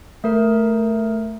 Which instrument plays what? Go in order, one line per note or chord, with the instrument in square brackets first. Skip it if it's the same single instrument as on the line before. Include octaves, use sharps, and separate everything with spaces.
[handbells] A3 A#4